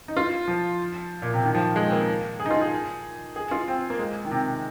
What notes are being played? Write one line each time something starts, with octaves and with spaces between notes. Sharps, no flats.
D#4
F4
F3
A#2
C3
D#3
F3
G#3
C4
A#3
G#4
D#4
F4
G#4
G#4
F4
C4
A#3
G#3
D#3
C3